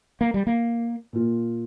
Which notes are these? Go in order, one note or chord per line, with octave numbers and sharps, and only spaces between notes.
A#3
G3
A#3
A#2 A#3 F4